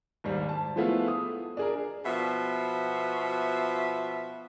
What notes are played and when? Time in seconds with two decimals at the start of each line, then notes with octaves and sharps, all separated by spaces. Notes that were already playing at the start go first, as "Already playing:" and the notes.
0.24 D#2 G#2 G3
0.49 A5
0.76 F3 G#3 A3 B3 E4 F4
1.08 D#6
1.57 D4 G#4 A#4
2.05 B2 F3 E5